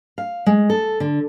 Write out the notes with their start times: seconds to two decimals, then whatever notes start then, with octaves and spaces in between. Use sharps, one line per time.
0.18 F5
0.46 G#3
0.70 A4
1.00 D3